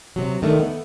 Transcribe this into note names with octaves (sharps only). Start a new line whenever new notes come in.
C3 F#3
D#3 A3 D4
B3